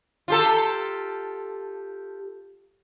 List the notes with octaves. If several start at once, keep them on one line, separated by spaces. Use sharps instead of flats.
F4 G4 A4